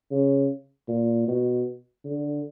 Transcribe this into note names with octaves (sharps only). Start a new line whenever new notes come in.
C#3
A#2
B2
D3